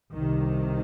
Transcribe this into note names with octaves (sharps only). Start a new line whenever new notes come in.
C2 C3 D#3